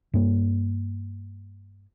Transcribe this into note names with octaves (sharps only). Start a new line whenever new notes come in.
G2 A#3